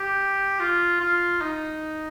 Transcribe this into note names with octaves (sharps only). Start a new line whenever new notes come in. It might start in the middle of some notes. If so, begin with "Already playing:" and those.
Already playing: G4
F4
F4
D#4